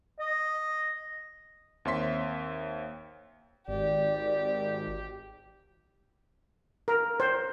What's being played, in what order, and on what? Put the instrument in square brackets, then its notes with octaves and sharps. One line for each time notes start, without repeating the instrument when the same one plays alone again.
[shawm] D#5
[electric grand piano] D#2 C4 C#5 E5 C6 B6
[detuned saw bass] G#1 [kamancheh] G4 [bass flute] D5
[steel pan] A#4
C5